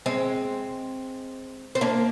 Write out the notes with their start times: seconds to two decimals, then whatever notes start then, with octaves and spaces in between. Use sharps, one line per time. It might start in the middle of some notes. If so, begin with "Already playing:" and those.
0.06 G#3 C4
1.75 C4
1.81 A#3 D4